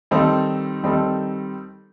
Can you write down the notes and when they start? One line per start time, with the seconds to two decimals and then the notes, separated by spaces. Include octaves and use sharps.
0.11 D#3 G3 C4 D#4 A4
0.83 D#3 G3 C4 D#4 A4